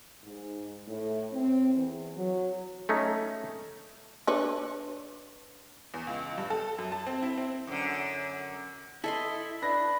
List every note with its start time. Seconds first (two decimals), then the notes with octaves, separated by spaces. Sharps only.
0.24 G#2
0.87 A2
1.33 C4
1.74 E2
2.16 F#3
2.89 A3 C#4 D#4
4.27 D4 B4 C#5
5.94 E2
6.07 C#2
6.38 G2
6.50 A4
6.78 F#2
6.92 A5
7.07 C4
7.22 E4
7.38 C4
7.67 F#2 D3
9.04 E4 A4 D#5 C6
9.62 D4 B4 A#6